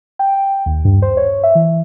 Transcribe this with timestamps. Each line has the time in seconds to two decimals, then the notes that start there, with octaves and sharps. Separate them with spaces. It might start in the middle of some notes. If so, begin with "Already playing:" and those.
0.19 G5
0.66 D#2
0.85 G2
1.02 C5
1.17 C#5
1.43 E5
1.55 E3